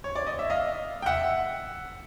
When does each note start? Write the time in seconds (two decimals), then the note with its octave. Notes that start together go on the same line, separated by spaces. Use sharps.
0.04 C#5
0.15 D5
0.27 D#5
0.39 E5
0.50 D#5 F5
1.02 G5
1.06 E5 F#5